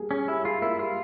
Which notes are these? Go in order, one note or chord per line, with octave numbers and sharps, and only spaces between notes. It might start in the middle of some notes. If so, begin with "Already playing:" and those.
Already playing: G3 A#3 G#4
C#4 G#4
G3 E4
F4 G#4
A#3 E4
G3 F4